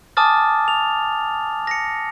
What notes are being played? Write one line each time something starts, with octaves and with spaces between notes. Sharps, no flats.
G#5 A5 D6 D#6 F6 A6
F7
A#6 C#7